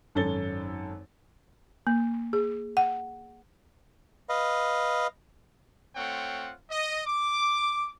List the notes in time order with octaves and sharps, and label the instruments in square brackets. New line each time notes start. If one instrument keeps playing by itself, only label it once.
[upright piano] G#1 F#2 A4 C#5 A6 G7
[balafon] A#3
G#4
F#5
[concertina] B4 D#5 F5
[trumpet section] A3 C4 F4 C#5 F#5 G5
D#5
D6